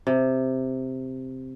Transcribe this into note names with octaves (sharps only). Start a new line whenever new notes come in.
C3